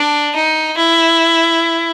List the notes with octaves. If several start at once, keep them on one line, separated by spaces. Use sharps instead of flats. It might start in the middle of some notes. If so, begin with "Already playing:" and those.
Already playing: D4
D#4
E4